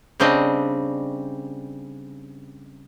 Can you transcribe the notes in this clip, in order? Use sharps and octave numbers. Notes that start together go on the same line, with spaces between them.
C#3 G3 C4 D4 D#5